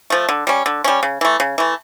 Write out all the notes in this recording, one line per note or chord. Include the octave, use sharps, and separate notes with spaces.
F3 A3
D3
G3 C#4
D3
G3 C#4
C#3
E3 A3
C#3
E3 A3